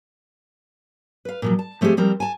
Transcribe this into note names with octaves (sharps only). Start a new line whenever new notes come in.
B4 F5
A#2 F3 F#3
A5
F3 A3 C4 G4 G#4 D#5
F3 G3 C4 A#4
G#5 A5